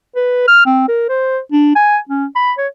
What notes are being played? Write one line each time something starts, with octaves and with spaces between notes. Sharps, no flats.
B4
F6
C4
A#4
C5
D4
G#5
C#4
B5
C#5